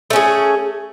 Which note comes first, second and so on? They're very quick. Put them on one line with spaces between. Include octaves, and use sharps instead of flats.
A3 C#4 G#4